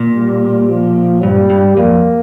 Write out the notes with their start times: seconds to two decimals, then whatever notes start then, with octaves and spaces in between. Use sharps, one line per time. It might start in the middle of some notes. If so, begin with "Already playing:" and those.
Already playing: A#2
0.15 G3
0.69 F3
1.23 G2 G3
1.50 G2
1.77 F2 A#3